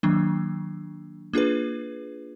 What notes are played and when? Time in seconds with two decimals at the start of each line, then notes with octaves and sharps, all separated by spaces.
0.03 D#3 F#3 A#3 D4
1.33 A#3 D4 F4 G#4 B4